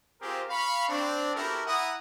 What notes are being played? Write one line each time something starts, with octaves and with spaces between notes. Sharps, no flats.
C4 F4 G4 G#4 A#4 C5
F5 B5 C#6
C4 D4
B3 E4 F#4 G4 A4 A#4
E4 F#5 A#5 D#6